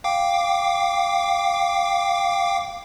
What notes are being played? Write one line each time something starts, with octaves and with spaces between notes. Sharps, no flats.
F5 G5 D6